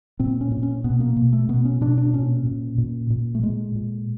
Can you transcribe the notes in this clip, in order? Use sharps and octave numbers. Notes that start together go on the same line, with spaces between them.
A#2 C4
C#4
A#2
C#4
B2 B3
A#3
B2
A3
B2 B3
C#4
B2 D4
D4
A#2 C#4
A#2
A#2
A#2
A3
A#2 G#3
A#2